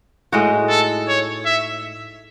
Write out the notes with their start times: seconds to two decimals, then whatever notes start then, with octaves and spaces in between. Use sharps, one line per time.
0.32 A2 G#3 D#4 F#4
0.69 A4
1.09 C#5
1.46 E5